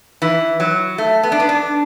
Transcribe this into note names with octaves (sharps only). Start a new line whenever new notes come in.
E3
F#3
A3
B3
D4
B3
D4